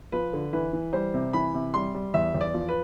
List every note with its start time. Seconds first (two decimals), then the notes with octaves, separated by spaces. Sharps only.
0.12 F3 B4
0.33 D3
0.53 E3 B4
0.73 E3
0.93 G3 C5
1.14 C3
1.33 E3 B5
1.54 C3
1.74 G3 C6
1.95 G3
2.14 E2 E5
2.34 E2
2.41 D5
2.54 F3
2.69 B4